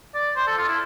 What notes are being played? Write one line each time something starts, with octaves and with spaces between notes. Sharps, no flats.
D5
C5
A4
F4
E4